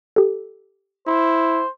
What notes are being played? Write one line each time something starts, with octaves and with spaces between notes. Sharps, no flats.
G4 A4
E4 C5